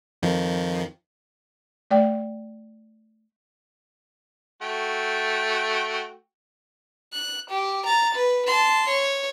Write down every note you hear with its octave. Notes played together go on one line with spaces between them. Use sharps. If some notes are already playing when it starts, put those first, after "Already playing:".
F2 D#3 F3
A3 D5 G5
A3 F#4 G5
F#6
G4
A#5 A6
B4
A5 C6
C#5